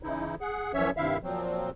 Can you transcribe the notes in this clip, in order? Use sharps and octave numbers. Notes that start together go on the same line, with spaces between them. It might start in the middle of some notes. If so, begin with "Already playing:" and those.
C#3 E3 D#4 E4
G#4 F#5
F#2 E3 F3 C#4 C#5 E5
G2 C3 D#3 E4 E5 F5
A#2 F3 F#3 C4